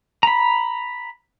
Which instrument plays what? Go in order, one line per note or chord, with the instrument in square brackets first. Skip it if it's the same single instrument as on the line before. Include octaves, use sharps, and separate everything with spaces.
[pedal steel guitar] A#5 B5